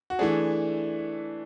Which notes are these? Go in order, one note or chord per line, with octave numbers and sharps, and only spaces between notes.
F#4
E3 A3 D4 G#4